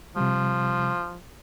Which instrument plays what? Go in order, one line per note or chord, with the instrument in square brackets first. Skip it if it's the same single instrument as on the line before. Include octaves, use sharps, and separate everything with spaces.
[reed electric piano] C3 G3 [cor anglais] F3